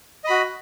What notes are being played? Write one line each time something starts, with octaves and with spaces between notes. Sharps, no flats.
F#4 D#5 B5